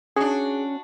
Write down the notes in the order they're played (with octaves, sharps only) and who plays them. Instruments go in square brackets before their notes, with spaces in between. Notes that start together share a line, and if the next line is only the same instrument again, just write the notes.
[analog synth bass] C#4 [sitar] D4 F#4 [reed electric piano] G#4